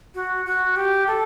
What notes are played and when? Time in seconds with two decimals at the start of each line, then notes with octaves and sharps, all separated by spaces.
0.14 F#4
0.46 F#4
0.76 G4
1.07 A4